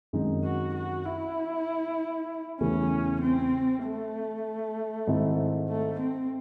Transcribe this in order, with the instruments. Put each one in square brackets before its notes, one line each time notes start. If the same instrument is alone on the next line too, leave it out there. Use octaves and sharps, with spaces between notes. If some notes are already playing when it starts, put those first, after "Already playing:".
[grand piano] F#2 D#3 G#3 C4 D#4
[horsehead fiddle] F#4
F#4
E4
[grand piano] E2 C#3 E3 A3 [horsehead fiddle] C#4
[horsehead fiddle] C4
A3
[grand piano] G#2 D#3 G#3 C4 E4
[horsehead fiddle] A3
C4